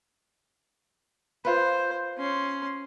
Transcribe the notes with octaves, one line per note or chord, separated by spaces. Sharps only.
F4 B4 C5
C#4 C6